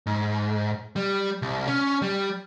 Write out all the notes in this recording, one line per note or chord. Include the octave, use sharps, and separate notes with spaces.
G#2
G3
C2
C#4
G3